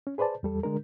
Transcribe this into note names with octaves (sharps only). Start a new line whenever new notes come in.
C#4
G#4 B4 C5 D5 A5
E2 G3 A4
D3 G#3 D4 A#4